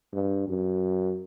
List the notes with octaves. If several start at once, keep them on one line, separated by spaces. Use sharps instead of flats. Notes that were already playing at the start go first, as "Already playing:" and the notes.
G2
F#2